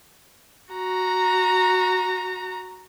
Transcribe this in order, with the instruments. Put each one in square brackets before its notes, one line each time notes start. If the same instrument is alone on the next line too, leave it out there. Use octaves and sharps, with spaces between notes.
[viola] F#4 A#5